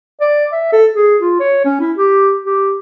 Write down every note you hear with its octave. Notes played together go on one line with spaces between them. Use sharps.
D5
E5
A4
G#4
F4
C#5
C#4
E4
G4
G4